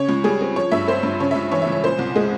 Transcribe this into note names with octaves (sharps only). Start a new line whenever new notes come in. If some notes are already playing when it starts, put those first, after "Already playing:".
Already playing: C#3 C#5
C#2
G3 G#4
C4
F3 C#5
G2 E5
C4 C5
G2
C#3 C#5
E5
C#2
E3 C#5
E5
C#2
C#5
A#2 C5
C2
G#3 G#4